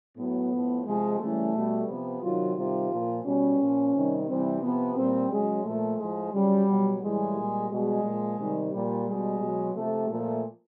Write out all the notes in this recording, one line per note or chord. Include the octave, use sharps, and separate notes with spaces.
A2 F#3 B3
A2 F3
C3 F3 G#3
C#3 E3 G3 A3
B2 G3
C3 F3 B3
C3 D#3 F#3 F4
C3 D#3 G3 F4
A#2 F3
B2 G3 C#4
A#2 F3
C3 D#3 G3
C3 E3 G3 C4
C3 F3 B3
A#2 G3 C4
C#3 F#3 G#3
A#2 F3 A3
A2 F3 G#3
C#3 F#3 G3
B2 F#3
A2 E3 G3 G#3
A#2 G3
B2 G3 G#3
A#2 F3
C3 D#3 G3
A#2 F3 G3
B2 G3 G#3
B2 F#3
C3 F3 A3
A#2 F3 A3